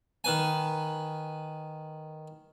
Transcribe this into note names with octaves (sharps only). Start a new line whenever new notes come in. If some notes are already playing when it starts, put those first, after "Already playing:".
D#3 B4 G#5